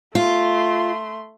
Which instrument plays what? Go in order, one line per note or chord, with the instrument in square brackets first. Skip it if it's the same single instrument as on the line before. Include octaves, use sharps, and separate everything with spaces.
[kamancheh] A3 C6 [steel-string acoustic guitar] F4